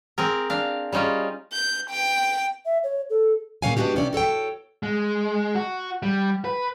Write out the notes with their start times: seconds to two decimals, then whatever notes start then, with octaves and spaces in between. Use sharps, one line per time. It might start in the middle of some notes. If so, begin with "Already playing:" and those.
0.18 C4 G#4 A#4
0.50 D4 F5
0.92 G3 C#4 D#4 F4 G#4
1.53 G6
1.90 G5
2.66 E5
2.84 C#5
3.10 A4
3.62 A#2 C#3 C#5 F5 F#5 G#5
3.77 G#3 B3 D4 F#4 G4
3.95 C3 F3 C#4 G4 D5
4.13 F#4 A4 C#5 G5
4.83 G#3
5.55 F#4
6.03 G3
6.45 B4